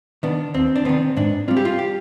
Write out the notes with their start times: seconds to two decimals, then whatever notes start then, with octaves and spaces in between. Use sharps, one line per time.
0.23 D#3 B3 D4
0.54 D#2 C4
0.76 D4
0.85 D#3 B3 C4
1.17 G#2 D4
1.48 G3 C4 F4
1.57 G4
1.65 F4
1.79 G4